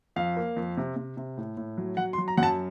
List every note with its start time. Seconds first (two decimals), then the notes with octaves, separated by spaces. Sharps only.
0.16 F2 F5
0.37 A#3
0.56 F2
0.77 C3
0.96 C3
1.17 C3
1.37 A2
1.57 A2
1.78 F#3
1.97 F#3 F#5
2.13 C6
2.18 F#3
2.28 A#5
2.37 F#2 F#5
2.43 A5